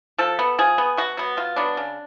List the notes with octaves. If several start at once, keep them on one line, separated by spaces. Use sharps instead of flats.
F3 A4
B3
F3 G#4
B3
B2 F#4
F#3 B3
B2 F4
F#3 B3 D4
C#3